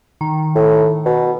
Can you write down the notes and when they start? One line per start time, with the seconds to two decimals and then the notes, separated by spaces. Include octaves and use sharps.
0.21 D#3
0.55 A2
1.06 B2